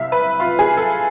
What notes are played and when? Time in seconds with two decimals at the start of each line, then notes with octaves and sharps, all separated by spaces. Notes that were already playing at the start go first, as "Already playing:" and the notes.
Already playing: C2 C3 E5 F5
0.12 B4
0.40 F4
0.59 G#4
0.77 A4